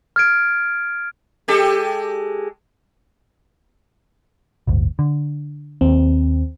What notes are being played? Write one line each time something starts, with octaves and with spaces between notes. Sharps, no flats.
F6 G#6 D7
G#3 G4 A4
D1 G1 D2
D3
D#2 C4